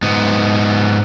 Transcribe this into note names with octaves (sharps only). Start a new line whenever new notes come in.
G#2 B3